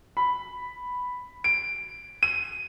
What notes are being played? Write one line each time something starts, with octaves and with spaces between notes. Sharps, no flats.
B5
D7
D#7